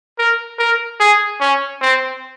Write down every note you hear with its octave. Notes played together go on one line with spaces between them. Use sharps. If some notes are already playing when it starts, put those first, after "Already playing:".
A#4
A#4
G#4
C#4
C4